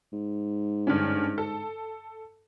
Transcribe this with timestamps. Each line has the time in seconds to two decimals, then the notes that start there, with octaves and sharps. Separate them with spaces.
0.13 G#2
0.87 G2 D3 C#4
1.38 A4